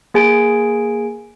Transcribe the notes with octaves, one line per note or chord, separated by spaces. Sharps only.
A#3 G#4 G#5 D7